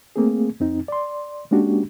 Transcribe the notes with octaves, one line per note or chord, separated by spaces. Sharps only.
A3 A#3 C4 G#4
F2 C4 D#4
D5 C6
G#3 A#3 C#4 D4 F#4 G4